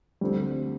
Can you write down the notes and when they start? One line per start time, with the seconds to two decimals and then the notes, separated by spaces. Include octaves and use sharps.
0.21 D2 D3 F3 G3 C4 G4